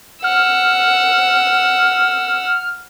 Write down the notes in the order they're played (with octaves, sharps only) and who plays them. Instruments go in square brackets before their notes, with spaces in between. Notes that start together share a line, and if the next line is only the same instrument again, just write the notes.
[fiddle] F#5 E6 [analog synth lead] F6